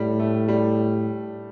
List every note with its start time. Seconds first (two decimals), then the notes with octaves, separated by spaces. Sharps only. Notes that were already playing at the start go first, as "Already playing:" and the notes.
Already playing: A2 G3
0.19 A3
0.48 G3